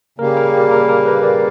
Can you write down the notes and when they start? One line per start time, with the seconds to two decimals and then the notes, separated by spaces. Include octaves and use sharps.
0.18 C#3 G3 A#3 A#4
0.37 A#4
0.54 G4
0.71 A#4
0.89 A#4
1.06 B4
1.23 D5